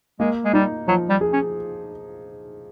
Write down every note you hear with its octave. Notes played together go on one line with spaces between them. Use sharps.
G#3 A#3
G#3
G3 D#4
F3 F#3
G3
G#4
C#4